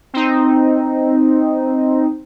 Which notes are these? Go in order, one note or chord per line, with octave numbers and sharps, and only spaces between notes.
C4 D#4